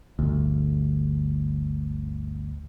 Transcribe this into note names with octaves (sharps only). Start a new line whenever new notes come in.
G1 D2